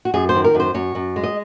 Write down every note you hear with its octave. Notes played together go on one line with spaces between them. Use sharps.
F#4
F#2 G#4
C5
D#3
A#4
F#2
C5
F#2 C#5
F#2
G#3
D#5